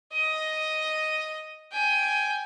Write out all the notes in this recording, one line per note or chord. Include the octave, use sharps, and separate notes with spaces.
D#5
G5 G#5